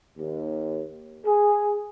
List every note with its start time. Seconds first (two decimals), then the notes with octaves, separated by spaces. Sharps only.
0.18 D#2
1.26 G#4